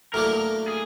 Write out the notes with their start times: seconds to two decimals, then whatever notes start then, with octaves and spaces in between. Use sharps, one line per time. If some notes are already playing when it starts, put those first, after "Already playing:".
0.14 A2 F#3 A#3 D4 A#4
0.68 G#4